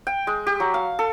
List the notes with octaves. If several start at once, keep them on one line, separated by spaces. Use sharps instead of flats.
G5
G#3
G4
F#3
F5
A4